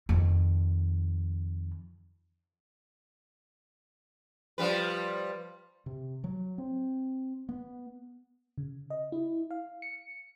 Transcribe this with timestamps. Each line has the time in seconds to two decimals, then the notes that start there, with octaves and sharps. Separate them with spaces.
0.09 F2 D#3
4.58 F3 G3 B4
5.86 C3
6.24 F#3
6.58 C4
7.49 B3
8.58 C#3
8.90 D#5
9.12 E4
9.51 F5
9.82 C#7